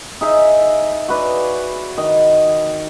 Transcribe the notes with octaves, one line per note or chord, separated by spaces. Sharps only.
D#4 G#4 E5
F#4 B4 D5
D#3 D#5